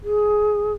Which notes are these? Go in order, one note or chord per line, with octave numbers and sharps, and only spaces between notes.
G#4